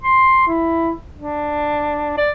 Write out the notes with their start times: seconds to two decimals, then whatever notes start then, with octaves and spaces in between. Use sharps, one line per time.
0.03 C6
0.47 E4
1.16 D4
2.17 D5